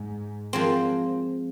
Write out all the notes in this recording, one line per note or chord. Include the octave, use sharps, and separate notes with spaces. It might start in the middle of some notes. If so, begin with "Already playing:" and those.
Already playing: G#2
F3 G#3 C4